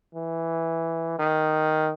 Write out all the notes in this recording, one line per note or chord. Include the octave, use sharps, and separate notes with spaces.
E3
D#3